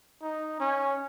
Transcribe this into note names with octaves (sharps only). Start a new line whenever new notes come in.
D#4
C#4